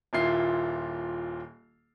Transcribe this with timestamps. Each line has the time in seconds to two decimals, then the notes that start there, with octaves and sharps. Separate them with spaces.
0.13 D#1 A#2 E4 F4 C7